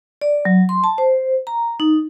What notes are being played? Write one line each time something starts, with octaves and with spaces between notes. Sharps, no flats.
D5
F#3
C6
A5
C5
A#5
D#4